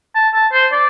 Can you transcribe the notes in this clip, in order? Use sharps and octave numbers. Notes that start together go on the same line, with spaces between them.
A5
A5
C5
D5